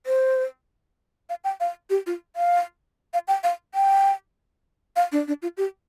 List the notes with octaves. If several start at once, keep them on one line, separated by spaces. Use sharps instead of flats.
C5
F5
G5
F5
G4
F4
F5
F5
G5
F5
G5
F5
D4
D4
F4
G4